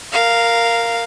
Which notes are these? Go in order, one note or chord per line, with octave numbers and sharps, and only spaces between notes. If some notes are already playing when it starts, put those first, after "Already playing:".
A#4 F5